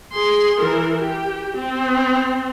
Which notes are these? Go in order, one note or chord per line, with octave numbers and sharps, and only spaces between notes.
G#4 C6
E3 A#4
G4
C4